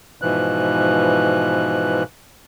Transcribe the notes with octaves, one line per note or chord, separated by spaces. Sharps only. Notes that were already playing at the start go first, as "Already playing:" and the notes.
G#2 B2 E3 F3 F#6